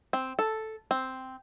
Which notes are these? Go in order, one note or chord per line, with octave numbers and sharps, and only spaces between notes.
C4
A4
C4